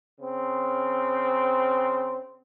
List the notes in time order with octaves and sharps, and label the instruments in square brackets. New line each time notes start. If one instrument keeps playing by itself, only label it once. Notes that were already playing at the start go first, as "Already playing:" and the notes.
[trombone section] C#3 C4